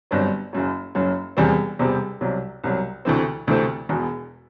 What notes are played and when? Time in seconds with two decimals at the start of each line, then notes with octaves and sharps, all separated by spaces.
0.11 G1 G2 F#3 C4
0.53 F#1 F#2 F#3
0.95 F#1 F#2 F#3
1.37 E1 E2 C3 G3 C4
1.79 E1 E2 C3 G3 C4
2.21 C2 C3 F#3
2.64 C2 C3 F#3
3.05 D2 C3 E3 A3 C4
3.47 D2 C3 E3 A3 C4
3.89 E1 E2 B2